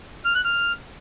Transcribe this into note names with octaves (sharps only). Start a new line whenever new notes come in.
F6
F#6
F6